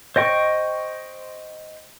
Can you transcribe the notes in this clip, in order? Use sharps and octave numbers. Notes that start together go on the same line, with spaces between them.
C5 D#5 G5 C#6